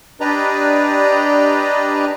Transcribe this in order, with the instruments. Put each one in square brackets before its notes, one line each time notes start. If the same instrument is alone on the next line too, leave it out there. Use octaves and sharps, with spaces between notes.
[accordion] D4 G4 B4 D5 D#5 A#5